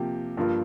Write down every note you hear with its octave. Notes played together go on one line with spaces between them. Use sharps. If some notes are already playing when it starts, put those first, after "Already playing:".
Already playing: C3 F3 A#3 G4
G2 F3 A#3 F4